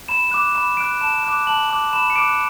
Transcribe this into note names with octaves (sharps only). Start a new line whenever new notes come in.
B5 E7
D6 F#6 E7
B5 E7
D6 F#6 D7
A5 E7
D6 F#6
A5 F#7
D6 F#6
B5 E7
C#7
D6 F#6 D7